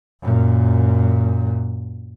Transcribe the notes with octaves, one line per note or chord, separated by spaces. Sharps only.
F#2 A#2